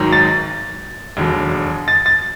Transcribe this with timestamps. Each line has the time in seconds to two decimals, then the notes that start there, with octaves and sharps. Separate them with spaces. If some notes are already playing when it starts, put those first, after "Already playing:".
Already playing: G#1 G#2 D#3 F#3
0.13 A6
1.17 E1 D#2 D3 F#3
1.88 A6
2.06 A6